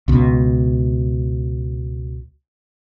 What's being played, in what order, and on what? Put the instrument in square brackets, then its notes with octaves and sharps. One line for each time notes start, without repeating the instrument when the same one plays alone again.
[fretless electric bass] C#2 B2